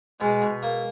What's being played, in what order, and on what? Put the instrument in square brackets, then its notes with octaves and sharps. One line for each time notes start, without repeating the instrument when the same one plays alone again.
[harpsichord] B2 [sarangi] G#3
[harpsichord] B2
A#3